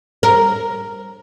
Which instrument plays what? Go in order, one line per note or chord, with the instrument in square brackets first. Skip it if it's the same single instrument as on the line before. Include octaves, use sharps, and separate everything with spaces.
[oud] A#4